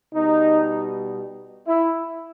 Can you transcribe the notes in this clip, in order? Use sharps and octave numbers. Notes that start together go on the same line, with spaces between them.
B2 G3 D#4
E4